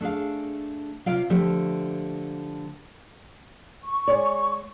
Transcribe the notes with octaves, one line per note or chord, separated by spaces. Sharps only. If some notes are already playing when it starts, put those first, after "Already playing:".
A3 D4 G#4 F5
C3 F4 D5 F5
D3 F3 A3 G4
C#6
G#3 C#5 D5